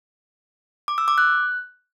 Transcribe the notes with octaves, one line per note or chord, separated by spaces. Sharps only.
D6
E6
D6
F#6